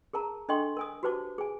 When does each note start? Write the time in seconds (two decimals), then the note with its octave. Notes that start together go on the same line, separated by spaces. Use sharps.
0.13 G#4 A#4 A5 A#5
0.49 D4 A4 D#5 G5 C6 C#6
0.77 A#4 G#5 D#6
1.03 F#4 G4 B4 C5 A5 D6
1.38 G#4 G#5